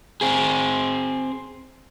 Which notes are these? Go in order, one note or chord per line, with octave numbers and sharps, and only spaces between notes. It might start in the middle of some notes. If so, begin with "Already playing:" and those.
C4 G#4